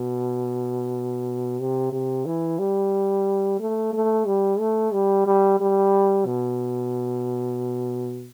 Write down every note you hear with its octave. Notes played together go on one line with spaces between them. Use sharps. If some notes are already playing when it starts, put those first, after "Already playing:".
Already playing: B2
C3
C3
E3
G3
A3
A3
G3
A3
G3
G3
G3
B2